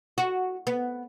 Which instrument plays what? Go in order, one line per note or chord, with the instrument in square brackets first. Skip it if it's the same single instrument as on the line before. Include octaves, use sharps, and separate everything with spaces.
[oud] F#4
B3